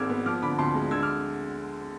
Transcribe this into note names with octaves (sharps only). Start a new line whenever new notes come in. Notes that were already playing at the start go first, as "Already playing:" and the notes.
Already playing: G#1 G#2 G#3 D6 E6 F6 G#6
B3
F3 D6 F6
D3 B5 D6
D2 A5 C6
G#3
D3 E6 G#6
D6 F6